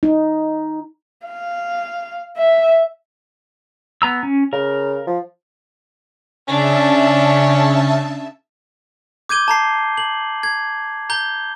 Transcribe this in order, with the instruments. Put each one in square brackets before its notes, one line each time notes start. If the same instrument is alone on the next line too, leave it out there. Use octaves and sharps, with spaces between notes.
[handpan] D#4
[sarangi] F5
E5
[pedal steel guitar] B3 A#5 E6
C#4
[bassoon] C#3 [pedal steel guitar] A#4
[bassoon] F3
[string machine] C#3 E5 A5 [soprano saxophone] C#4 [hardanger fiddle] D4
[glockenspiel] D6 G6 G#6 D#7 G7
A5 A#5 C7
F#7
G#6
A#5 G6 G7